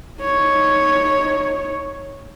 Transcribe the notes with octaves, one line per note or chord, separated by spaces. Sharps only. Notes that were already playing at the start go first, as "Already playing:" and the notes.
D#4 C#5